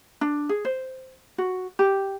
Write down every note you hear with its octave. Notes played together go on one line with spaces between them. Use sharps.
D4
G#4
C5
F#4
G4